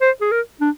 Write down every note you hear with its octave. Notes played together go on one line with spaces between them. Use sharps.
C5
G#4
A#4
D4